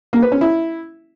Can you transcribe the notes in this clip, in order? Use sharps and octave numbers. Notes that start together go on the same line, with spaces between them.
A#3
B4
C#4
E4